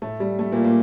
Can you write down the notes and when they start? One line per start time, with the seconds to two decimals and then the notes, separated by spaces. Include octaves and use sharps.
0.02 A2 A3
0.20 G3
0.39 A3
0.52 A#2 A#3
0.64 A#2 A#3